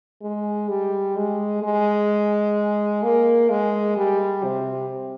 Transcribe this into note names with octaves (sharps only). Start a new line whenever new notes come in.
G#3
G3
G#3
G#3
A#3
G#3
G3
C3